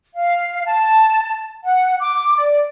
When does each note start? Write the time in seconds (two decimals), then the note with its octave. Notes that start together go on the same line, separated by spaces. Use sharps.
0.15 F5
0.65 A5
1.64 F#5
2.01 D6
2.37 D5